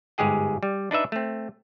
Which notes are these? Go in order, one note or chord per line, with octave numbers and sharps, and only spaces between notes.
G1 G#2 G#3 G4 G#4 G5
G3
D4 D#4 B4 E5
A3 C4